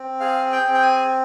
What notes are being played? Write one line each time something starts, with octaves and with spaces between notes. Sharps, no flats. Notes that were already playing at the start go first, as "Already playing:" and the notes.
Already playing: C4
G#4 F5
G5
C4
G5
G#5